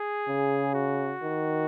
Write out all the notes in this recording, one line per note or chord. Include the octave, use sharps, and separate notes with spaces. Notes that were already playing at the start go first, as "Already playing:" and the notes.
Already playing: G#4
C#3
F#4
D#3